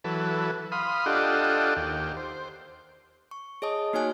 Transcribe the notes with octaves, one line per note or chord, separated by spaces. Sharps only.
E3 F#3 A4 B4
F5 B5 C6 D#6
D4 F4 G4 A4 D#5 F#5
D#2 G4
C5
C#6
G#4 C#5 D#5 A5 D#6
A#3 D#4 F#4 C#5 G#5 F#6